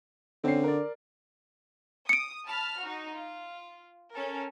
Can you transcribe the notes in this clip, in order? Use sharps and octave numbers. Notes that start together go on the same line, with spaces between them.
D3 C4 C#4 C7
A#4 D5
D#6 C#7 D7
A5 B5 F6
D#4 F#4
F4
C#4 A4 A#4